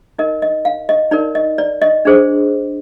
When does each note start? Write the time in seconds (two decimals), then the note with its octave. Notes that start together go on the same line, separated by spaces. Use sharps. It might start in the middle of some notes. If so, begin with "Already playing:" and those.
0.19 D#4 A#4 D#5
0.42 D#5
0.65 F5
0.89 D#5
1.11 D#4 A#4 D5
1.35 D#5
1.58 D5
1.82 D#5
2.05 D4 G#4 C5